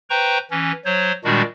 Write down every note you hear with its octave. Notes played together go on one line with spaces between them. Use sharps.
B4 C5 G5 A#5 C#6
E3 C#4
F#3 C5 C#5
A#2 D#3 G3 G#3 D4 F#4